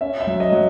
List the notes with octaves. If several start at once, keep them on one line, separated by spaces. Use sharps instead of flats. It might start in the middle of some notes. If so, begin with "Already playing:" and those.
C#4 E5
E5
F#3
D#5
F#3